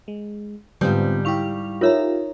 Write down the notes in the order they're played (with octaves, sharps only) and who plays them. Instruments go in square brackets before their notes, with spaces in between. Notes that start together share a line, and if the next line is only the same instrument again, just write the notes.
[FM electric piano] G#3
[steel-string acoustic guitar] G#2 G3 [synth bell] D3 G#3 G6 [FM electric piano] B3 C4 F4
[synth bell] E4 C#6 F7 [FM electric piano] G4 F5
[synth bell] D#4 E5 A#5 [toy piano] F4 A#4 C#5